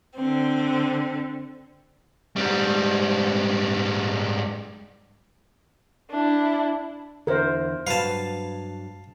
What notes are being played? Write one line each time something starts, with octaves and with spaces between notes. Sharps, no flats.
D3 C4
G#2 G3
D4 E4
E2 D3 E4 A#4 C5
G2 F#3 B4 F5 A5